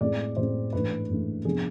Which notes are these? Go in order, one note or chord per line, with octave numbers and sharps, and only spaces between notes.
A2 G#3 C4 D5
A2 G#3 C4 C5
G#2 E3 A3 D4 B4
G#2 E3 A3 D4
C3 F3 B3 D4 G#4